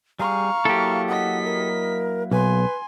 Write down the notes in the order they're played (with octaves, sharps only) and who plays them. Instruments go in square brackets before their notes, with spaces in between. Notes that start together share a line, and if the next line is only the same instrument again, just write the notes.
[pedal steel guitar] G3 G#4 [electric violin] F5 C#6 [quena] A#5
[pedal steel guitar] F#3 A#3 E4 [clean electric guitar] G4 A4
[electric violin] D#5 B6 [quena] F#5
[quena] A#4
[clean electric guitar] B1 [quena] B4 [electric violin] G#5 C6